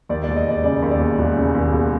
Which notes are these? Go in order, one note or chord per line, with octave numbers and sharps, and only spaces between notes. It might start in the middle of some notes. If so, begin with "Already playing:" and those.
D#2 D5
D5
E1
D#5
E1 D5
C#3 D5
D#2
D5
E1
E1
C#3
D#2
E1